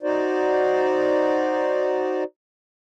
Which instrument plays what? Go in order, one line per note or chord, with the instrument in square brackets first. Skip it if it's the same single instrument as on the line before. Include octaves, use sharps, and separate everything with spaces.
[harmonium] D#4 F#4 C5 D5